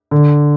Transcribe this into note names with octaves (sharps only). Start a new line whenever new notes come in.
D3